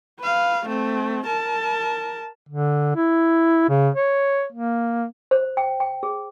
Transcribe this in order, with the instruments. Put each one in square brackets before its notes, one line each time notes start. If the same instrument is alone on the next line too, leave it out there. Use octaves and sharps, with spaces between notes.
[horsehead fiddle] B4 F5
A3 C4
A#4 A5
[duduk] D3
E4
C#3
C#5
A#3
[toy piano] C5
G5
G5
G#4